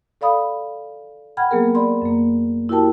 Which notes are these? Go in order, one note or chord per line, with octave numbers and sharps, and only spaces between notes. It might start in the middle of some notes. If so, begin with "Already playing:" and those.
A4 D5 F5 B5 D#6
F#5 G5 B5 F6 G#6
F#3 A#3 B3 G#4 A#4
D5 B5 C6
F#2 A#3
E4 F#4 G4 A#4 G5 A5